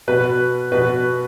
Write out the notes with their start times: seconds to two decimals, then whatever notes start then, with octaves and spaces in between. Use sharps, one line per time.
0.08 B2 B4
0.72 B2 B4